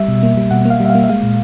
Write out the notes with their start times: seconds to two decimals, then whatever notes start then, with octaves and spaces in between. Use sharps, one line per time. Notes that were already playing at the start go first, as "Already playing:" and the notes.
Already playing: G3 E5
0.08 B2
0.23 A#3
0.37 G3
0.51 B2 F#5
0.65 A#3
0.70 F5
0.80 G3
0.85 E5
0.90 F5
0.95 A#3
1.04 E5
1.09 G#3 F5
1.23 A#2